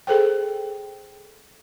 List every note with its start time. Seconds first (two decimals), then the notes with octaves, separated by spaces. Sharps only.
0.07 G#4 A4 C5 G5